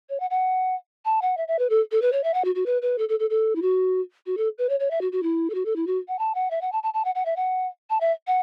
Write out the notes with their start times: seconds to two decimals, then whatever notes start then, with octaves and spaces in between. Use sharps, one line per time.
0.09 C#5
0.20 F#5
0.30 F#5
1.05 A5
1.22 F#5
1.37 E5
1.48 E5
1.59 B4
1.70 A4
1.91 A4
2.02 B4
2.12 C#5
2.23 E5
2.34 F#5
2.45 F#4
2.55 F#4
2.66 B4
2.82 B4
2.98 A4
3.09 A4
3.19 A4
3.30 A4
3.55 E4
3.62 F#4
4.26 F#4
4.37 A4
4.58 B4
4.69 C#5
4.80 C#5
4.91 E5
5.01 F#4
5.12 F#4
5.23 E4
5.50 A4
5.54 F#4
5.65 A4
5.76 E4
5.87 F#4
6.08 F#5
6.19 A5
6.35 F#5
6.51 E5
6.61 F#5
6.72 A5
6.83 A5
6.94 A5
7.05 F#5
7.15 F#5
7.25 E5
7.36 F#5
7.90 A5
8.00 E5
8.27 F#5